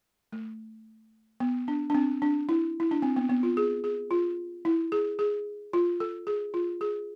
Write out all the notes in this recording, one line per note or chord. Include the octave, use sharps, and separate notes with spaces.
A3
B3
D4
D4
C4
D4
E4
E4
D4
C4
B3
B3
F4
G#4
G#4
F4
E4
G#4
G#4
F4
A4
G#4
F4
G#4